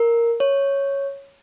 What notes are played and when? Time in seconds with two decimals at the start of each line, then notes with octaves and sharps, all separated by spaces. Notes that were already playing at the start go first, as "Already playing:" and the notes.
Already playing: A#4
0.40 C#5